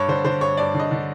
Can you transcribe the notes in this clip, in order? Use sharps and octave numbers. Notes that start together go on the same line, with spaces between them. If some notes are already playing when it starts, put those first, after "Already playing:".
Already playing: G2 C#5
D3 C5
D3 C5
G2 C#5
G2 D5
D3
D#5
D3